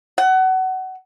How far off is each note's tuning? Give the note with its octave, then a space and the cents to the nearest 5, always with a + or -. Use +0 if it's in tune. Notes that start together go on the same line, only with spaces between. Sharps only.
F#5 +25